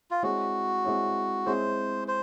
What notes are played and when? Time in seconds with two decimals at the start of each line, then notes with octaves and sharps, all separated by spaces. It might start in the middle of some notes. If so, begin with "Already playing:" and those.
0.11 F4
0.23 G#3 C4 E4 F#4 G#4 C#5
0.85 G#3 C4 E4 G#4 C#5
1.46 G#3 C4 E4 G#4 C5 C#5
2.08 C5